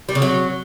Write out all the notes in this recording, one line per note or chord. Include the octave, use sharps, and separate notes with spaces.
G3
C#3
F#3